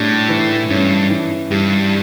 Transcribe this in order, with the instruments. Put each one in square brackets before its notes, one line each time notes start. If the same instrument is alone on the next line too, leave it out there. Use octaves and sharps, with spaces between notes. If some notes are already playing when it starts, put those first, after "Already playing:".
Already playing: [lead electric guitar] A2 [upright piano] G3 D4
[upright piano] E3
[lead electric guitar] G2 [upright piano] C#4
[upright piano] E3
[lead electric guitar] G2 [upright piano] G3